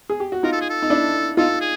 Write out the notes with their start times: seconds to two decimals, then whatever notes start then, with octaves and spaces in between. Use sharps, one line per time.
0.10 G#4
0.20 G4
0.32 F#4
0.43 D#4 F4 A#4
0.52 A4
0.61 G#4
0.70 A4
0.83 D#4
0.90 D4 E4
1.37 D#4 F4 A4
1.61 G#4